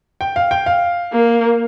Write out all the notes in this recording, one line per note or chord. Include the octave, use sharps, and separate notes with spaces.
G5
F5
G5
F5
A#3